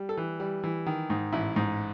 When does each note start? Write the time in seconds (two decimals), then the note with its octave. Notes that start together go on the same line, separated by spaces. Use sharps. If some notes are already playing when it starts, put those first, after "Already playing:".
Already playing: G3
0.09 A4
0.17 E3
0.40 G3
0.64 E3
0.86 D#3
1.10 G#2
1.33 A1 E4
1.56 G#2